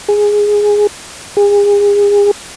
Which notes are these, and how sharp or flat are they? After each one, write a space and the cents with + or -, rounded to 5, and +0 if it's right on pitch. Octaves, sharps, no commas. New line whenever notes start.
G#4 -5
G#4 -35